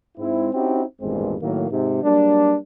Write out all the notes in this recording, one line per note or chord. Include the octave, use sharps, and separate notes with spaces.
G#2 C4 E4
C4 C#4 D#4 E4 F#4 G4
G#1 E2 G2 A#2 G#3 C4
A2 D#3 F#3 A#3
G#2 C3
F#3 G3 A#3 D4